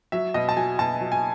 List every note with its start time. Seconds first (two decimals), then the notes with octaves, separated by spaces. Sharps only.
0.12 F#3 E5
0.34 B2 D#5
0.49 A5
0.56 F#3 G#5
0.79 B2 A5
1.01 F#3
1.12 G#5